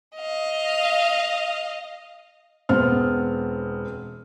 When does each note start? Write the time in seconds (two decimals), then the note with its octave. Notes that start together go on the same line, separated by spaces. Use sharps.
0.16 D#5 F5
2.69 E1 B3 C4 F6